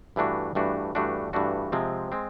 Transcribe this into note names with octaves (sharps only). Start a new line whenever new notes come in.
G2 E3 A3 D4 F#4
G2 E3 A3 D4 F#4
G2 E3 A3 D4 F#4
G2 E3 A3 D4 F#4
C3 F3 G#3 C4
G#3 C4